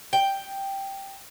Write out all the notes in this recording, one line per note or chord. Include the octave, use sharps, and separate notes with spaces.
G5